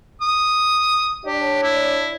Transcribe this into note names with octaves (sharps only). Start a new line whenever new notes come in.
D#6
D4 G4 C#5 D5
E4